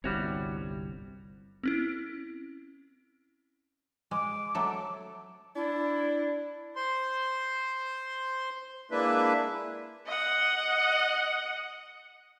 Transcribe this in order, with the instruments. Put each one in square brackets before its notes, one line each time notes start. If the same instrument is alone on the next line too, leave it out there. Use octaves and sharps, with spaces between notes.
[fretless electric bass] G1 C2 C3 [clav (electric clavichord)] G3 F#4 C#5
[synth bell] C4 C#4 E4
[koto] G#3 [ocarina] D6
[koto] F#3 A3 A4
[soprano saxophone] D4 [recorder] E4
[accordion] C5 C6
G#3 A#3 D4 E4 B4 E5
[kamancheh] D#5 F#5